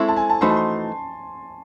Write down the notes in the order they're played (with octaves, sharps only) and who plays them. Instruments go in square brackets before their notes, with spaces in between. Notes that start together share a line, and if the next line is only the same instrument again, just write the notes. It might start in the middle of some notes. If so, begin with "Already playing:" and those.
Already playing: [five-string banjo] G#3 C4 E4 A4 [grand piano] C#6
[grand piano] A5
G#5
A5
[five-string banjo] E3 A3 D#4 F#4 C5 [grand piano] C6
[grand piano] A5
C6